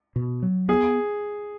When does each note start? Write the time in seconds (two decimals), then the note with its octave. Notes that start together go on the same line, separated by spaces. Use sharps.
0.16 B2
0.43 F#3
0.68 B3 G#4